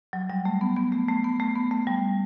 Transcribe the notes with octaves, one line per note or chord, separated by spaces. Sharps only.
F#3
G3
A3
B3
B3
A3
A3
B3
A3
B3
A3
G3